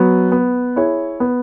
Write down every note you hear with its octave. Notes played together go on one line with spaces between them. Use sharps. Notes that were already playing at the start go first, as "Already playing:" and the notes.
Already playing: F#3 B3
B3
E4 G#4 C#5
B3